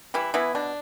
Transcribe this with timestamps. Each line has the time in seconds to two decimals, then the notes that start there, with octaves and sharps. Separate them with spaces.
0.14 E3 G3 E4
0.34 E3 B3 E4
0.55 B2 D4